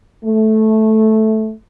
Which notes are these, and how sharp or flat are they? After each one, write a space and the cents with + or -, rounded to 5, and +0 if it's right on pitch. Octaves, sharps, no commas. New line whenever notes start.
A3 -10